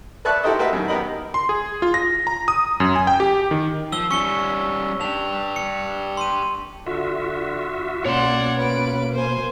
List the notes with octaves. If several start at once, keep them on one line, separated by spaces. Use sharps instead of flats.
B4 D5 E5 A5 C#6 F#6
E4 G4 A4 A#4 C5 D#5
F#4 G4 A#4 B4 E5 F5
F#2 D#3
B3 G4 A#4 D#5 B5
C6
G#4
F4
A#6
A#5
D#6
F#2
G#5
G5
G4
D#3
F3 E6 G7
G3 C#4 C#6 C#7 G7
D4 G4 F7
C#7
C6 D#7
D3 F4 F#4 E5
B2 A#3 C#4 C#5 D5 F#5 C6
B4 D7
A#4 C5 G#5